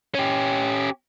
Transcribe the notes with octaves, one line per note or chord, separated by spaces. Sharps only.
C#4 G4